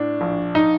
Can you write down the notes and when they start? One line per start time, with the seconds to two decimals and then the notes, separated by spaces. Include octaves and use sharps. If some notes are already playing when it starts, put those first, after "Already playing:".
Already playing: A2 D4
0.21 A#1
0.55 D#4